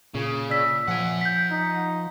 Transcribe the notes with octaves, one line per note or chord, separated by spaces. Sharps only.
A#2 C#3
D5 E6 B6
F3 F#5 G#5
G6 B6
D#4